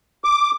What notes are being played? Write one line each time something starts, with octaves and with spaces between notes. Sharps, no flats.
D6